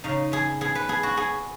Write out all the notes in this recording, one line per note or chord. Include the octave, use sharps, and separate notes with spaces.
C#3 D#4
B3 G#4
B3 G#4
B4
B3 G#4
F#4
B3 G#4